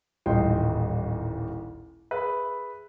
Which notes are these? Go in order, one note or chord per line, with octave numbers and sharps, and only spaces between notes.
D#1 A1 G3 D#4 G5 C6
G#4 B4 E5 B5